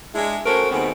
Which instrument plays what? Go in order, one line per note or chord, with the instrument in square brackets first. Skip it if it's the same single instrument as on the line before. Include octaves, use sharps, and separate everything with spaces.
[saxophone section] G#3 D4 E4
A3 C#4 F#4 A4 A#4 C5
D#2 B2 A3 B3 C4 G#4